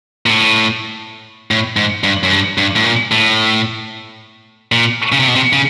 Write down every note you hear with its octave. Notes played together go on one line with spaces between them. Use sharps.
A#2
A2
A2
G#2
G2
F#2
G2
G2
A2
A#2
A2
A#2
C#3
C3
B2
C3
C#3